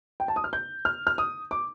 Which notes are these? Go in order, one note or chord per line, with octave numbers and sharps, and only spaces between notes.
G5
A5
D#6
F6
G6
F6
F6
D#6
D6